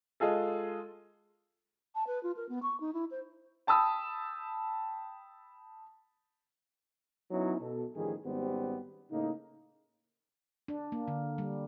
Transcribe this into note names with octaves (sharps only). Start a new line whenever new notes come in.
G#3 F4 G#4 A4
A5
B4
F4
A#4
B3
C#6
D#4
E4
C5
G5 A5 B5 D#6 E6
F#3 B3 C#4 D#4 E4
B2 A4
A1 D#3 F3 G3 G#4
G#1 G3 B3 C#4 G4 C5
A2 C#3 A#3 D#4
D4
A#3
D3
G3